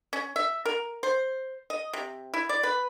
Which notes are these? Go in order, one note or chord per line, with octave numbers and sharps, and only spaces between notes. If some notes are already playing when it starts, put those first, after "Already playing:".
C#4
E5
A#4
C5
D#5
C3
E4
D5
B4